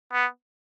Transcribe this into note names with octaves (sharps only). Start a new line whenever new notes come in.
B3